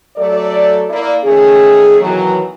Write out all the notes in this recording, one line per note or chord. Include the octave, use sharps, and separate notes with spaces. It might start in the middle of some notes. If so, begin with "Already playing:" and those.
F#3 A3 A4 D5
A#3 E4 D5
D#3 A3 C#4 G#4
B2 D#3 E3 F#3